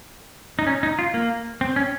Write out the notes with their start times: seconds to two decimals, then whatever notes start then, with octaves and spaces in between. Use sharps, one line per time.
0.59 D#4
0.67 C#4
0.83 D#4
0.99 F4
1.14 A#3
1.61 C4
1.76 C#4